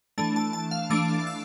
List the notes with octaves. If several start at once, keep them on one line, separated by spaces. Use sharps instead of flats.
E3 A3 D4 A5
A5
A5
F5
E3 A3 D4 D6
E6